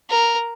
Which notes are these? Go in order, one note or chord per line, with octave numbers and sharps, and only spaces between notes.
A#4